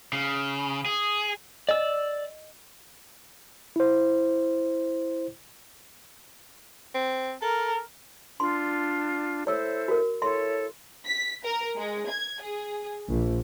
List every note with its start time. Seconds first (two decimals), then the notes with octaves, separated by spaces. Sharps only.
0.13 C#3
0.86 G#4
1.69 D5 D#5 E6
3.76 E4 C5
6.95 C4
7.42 A4 A#4
8.40 D4 F4 C6
9.47 E4 A4 C5 C#5 E6
9.88 F#4 A#4
10.22 E4 A4 C#5 E5 C6
11.06 B6
11.44 A#4
11.77 G#3
12.09 G#6
12.42 G#4
13.09 A#1